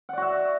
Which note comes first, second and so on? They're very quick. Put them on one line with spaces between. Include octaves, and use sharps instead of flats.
F#5 D5 F#4 E5